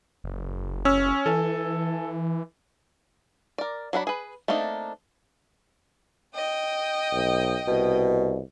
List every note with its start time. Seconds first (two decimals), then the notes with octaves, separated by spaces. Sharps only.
0.24 F#1
0.85 C#4 E6
1.26 E3 A4 G#5
3.58 A#4 D5
3.93 F#3 D4 F#5 B5
4.07 G#4 B4
4.48 A3 A#3 C4 D4 D#4
6.35 D#5 G5
7.13 B1
7.67 C2 B2